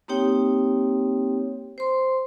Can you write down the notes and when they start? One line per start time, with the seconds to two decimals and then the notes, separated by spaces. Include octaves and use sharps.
0.08 A#3 C4 D#4 G4 C#5 G5
1.78 C5 C6